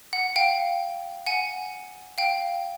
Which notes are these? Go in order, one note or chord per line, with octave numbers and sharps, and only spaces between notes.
F#5
F5 G5
F#5 G#5
F5 G5